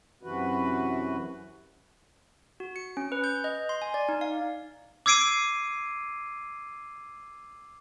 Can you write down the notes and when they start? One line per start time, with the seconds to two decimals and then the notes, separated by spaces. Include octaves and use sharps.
0.23 F#2 C3 E3 F#4 B4
2.60 F#4
2.76 C#7
2.97 C#4
3.12 B4
3.24 G6
3.44 D#5
3.69 C6
3.82 G#5
3.94 D5
4.09 D#4
4.21 F5
5.06 D6 E6 G#6 C7 D7 D#7